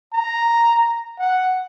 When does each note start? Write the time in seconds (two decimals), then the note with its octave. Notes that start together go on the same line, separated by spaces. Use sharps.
0.13 A#5
1.19 F#5